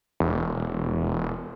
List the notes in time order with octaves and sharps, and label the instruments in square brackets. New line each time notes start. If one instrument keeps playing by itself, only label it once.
[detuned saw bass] E1